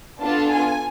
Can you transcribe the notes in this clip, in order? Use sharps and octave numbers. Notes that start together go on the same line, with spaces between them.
B3 D4 F4 A4 A5
G#5